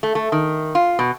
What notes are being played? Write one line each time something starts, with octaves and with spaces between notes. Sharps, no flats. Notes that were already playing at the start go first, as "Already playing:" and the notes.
A3
A3
D#3
F4
B2